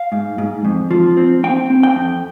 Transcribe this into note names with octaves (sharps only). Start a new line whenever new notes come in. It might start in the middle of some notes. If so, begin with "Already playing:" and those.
Already playing: F5
G#2
G#2
F2
F3
C4
C4 G5
C4
G5
F2